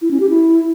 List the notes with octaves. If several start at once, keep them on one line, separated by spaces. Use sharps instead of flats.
E4
C#4
G4
E4